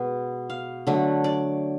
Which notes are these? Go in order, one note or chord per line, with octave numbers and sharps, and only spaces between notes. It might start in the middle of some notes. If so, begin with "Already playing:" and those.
Already playing: B2 G#3 B3 B4
F5
D3 F#3 A3
D5